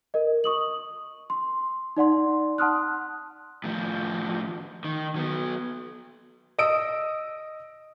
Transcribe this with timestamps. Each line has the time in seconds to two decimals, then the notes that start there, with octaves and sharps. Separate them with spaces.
0.14 A#4 D#5
0.44 C#6 D#6 F#7
1.30 C6
1.97 D#4 D5 F#5 C6
2.58 F#5 A5 C6 D#6 F6 F#6
3.64 A2 F3
4.84 D#3
5.16 F#3 B3
6.58 D#5 D#6 E6 D7